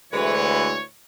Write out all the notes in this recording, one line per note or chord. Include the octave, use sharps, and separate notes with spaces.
D2 E3 G#3 B4 C#5